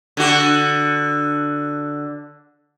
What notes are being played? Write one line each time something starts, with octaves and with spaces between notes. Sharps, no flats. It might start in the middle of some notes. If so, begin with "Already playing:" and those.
D3 F#4